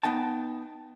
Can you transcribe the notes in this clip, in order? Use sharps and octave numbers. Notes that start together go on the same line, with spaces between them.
B3 D#4 G5 A5